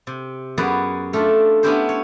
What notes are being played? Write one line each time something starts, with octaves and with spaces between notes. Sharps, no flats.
C3
F#2 B3 F#4 G#4 B4 D5
A3 D4 F4
B3 C#4 D4 E4 G4 C5
C#5